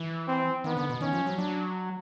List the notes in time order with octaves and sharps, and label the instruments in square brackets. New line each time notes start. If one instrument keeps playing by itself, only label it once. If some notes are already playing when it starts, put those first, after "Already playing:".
Already playing: [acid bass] E3
[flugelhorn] C4
[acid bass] D#3 [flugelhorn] B3
[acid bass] D3
B2
[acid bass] D#3 [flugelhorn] C#4
[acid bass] F3
F#3
[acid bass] F#3 [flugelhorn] D4